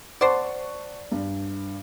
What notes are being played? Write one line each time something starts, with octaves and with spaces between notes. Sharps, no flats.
C5 D5 F#5 A5 C#6
G2